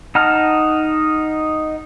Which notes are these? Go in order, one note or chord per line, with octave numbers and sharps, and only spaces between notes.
D#4 F#5 A5 A#5 F6